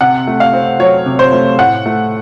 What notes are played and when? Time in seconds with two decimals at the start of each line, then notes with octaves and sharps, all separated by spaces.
0.01 C3 F#5
0.27 A3
0.40 F5
0.53 C4
0.80 F#3 C#5
1.06 C3
1.19 C5
1.33 A3
1.59 A2 F#5
1.86 A3